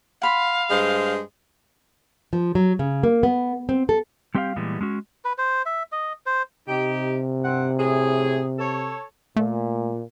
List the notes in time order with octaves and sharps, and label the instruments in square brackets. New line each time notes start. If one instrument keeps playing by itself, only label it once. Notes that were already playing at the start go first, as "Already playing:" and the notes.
[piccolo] F5 [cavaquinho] F#5 B5 C6
[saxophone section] G2 G#3 C5
[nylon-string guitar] F3
F#3
C#3
A#3
B3
C4
A4
[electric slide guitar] G3 C4 G4 C5 E5 F5
A#2 E3 G3 G#3 B3
G#3 C#4 F#4
[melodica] B4
C5
E5
D#5
C5
[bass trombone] C3 [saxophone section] D#4 G4
[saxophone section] G2 C4 F#5
A2 G#4
A4 C#5
[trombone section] A#2 [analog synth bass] A3